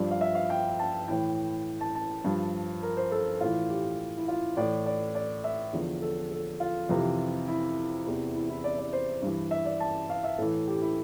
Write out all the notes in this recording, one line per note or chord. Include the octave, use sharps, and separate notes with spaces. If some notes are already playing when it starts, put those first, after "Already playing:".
Already playing: G2 F3 D5
F5
E5
F5
G5
A5
A2 E3 G5
A5
A5
G2 F3
A#4
C5
A4
A2 E3 F4
G4
E4
F4
A2 E3 D5
D5
D5
E5
E2 D3 F3
A4
A4
F4
F2 C3 E3
E4
E2 C3 E3
E4
E4
D5
D5
C5
G2 E3
E5
D5
A5
F5
E5
A2 E3 A4
G4
E4